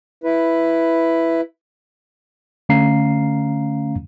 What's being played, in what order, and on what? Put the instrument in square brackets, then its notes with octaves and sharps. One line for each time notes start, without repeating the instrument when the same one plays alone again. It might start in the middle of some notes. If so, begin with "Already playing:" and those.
[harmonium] E4 B4
[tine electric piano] D3 A3 C#4 F5 A#5 C7